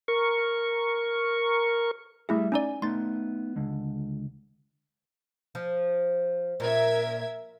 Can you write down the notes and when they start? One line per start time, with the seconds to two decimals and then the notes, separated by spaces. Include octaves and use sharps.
0.08 A#4 C#6
2.29 G3 A3 E4 G#4 E5
2.52 C#4 D#4 D5 G#5
2.82 A3 B3 D#4 C6 A6
3.56 C#2 D3 G#3
5.55 F3
6.60 A#2 A#4 E5 G#6